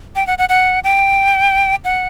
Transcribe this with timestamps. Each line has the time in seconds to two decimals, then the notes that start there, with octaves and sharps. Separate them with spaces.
0.16 G5
0.27 F#5
0.38 F#5
0.49 F#5
0.84 G5
1.84 F#5